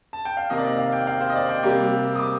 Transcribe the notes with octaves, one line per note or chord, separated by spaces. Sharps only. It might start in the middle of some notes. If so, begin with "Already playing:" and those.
A5
G5
F5
C3 D#3 A#3 D#5
D5
D#5
F5
G5
F5
C5
D#5
D5
G5
C3 G3 A#3
D#6
D6